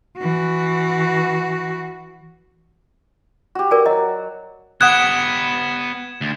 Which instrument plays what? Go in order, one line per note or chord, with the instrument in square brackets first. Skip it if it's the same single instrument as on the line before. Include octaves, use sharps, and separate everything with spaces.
[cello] E3 F#4
[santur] F#4 G4
[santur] F#4 [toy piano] A#4 D5 G#5
[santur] F#3 [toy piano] D#5
[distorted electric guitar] B3 G4 [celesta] F#5 D#6 F#6 [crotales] G#6 E7
[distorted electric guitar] D2